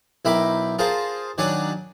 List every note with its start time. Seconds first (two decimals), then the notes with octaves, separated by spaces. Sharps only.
0.25 B1 E4 A#4 G5 B5 D6
0.79 F4 G#4 A#4 C5 A5
1.38 D#3 F#3 D4 D5 F#5 G#5